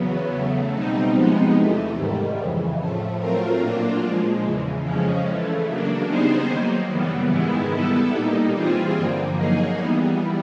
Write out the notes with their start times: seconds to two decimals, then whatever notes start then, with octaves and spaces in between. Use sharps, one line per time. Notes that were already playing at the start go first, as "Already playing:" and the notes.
Already playing: E2 C#3 F#3 B3
0.31 C#3 F#3 A3
0.72 B2 G3 C4 D#4
1.13 C3 F3 G#3 B3 D#4
1.54 E2 C3 E3 A3
1.96 G#2 D#3 G3
2.36 F2 C#3 E3
2.78 A2 F3 A3
3.19 F#3 A3 C4 F4 A#4
3.60 A#2 F#3 A#3 D4 F4
4.01 A#2 F3 G#3
4.42 E2 C#3 E3
4.84 F2 C#3 F3 G#3 C#4
5.25 C#3 E3 A3
5.66 C#3 F#3 A#3 D4
6.07 G3 B3 D#4 G#4 C5
6.48 D#3 F#3 A#3
6.90 F#2 C#3 E3 G3 B3
7.30 G#2 D#3 G#3 B3 E4
7.72 G3 B3 E4 A4
8.13 A#2 G3 A#3 D#4
8.54 E3 G3 C4 F4 G#4
8.95 G2 D3 F3 A#3
9.37 F#3 A#3 D#4 G#4
9.77 E3 G3 B3